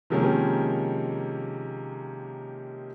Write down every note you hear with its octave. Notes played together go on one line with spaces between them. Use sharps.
C3 D#3 F3 G#3 A#3 C#4